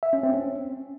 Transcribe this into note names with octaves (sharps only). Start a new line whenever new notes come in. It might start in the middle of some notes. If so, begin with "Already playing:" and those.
E5
C#4
C4
C#4